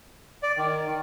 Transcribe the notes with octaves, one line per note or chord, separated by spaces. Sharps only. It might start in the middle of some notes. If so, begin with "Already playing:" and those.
D5
D#3